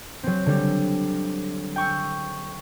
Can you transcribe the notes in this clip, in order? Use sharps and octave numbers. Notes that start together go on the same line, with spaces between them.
F#3 C4
D3 G3
G5 C#6 E6